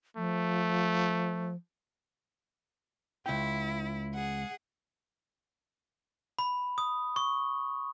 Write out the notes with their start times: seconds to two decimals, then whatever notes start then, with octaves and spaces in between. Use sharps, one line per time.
0.17 F3 A3
3.26 C#2 E4 G5
4.14 G#4 F#5
6.39 B5
6.78 D#6
7.16 C#6